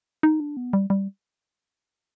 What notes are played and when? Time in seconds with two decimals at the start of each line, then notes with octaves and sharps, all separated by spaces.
0.23 D#4
0.40 D4
0.57 B3
0.73 G3
0.90 G3